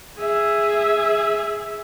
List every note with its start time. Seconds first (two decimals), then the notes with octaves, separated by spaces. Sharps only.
0.18 G#4 E5